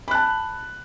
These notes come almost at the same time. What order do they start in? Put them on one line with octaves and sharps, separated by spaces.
B5 F#6 A5